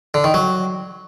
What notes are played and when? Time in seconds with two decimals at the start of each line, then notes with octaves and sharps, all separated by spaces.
0.14 D3
0.24 D#3
0.34 F#3